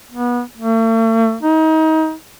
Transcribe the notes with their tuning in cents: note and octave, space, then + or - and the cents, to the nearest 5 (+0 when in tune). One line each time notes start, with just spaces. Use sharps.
B3 -25
A3 +45
D#4 +30